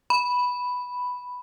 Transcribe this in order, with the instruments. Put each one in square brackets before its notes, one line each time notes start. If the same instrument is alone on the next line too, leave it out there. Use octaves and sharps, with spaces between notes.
[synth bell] B5